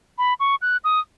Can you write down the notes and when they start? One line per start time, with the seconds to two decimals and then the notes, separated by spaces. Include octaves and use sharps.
0.18 B5
0.40 C#6
0.62 F#6
0.84 D#6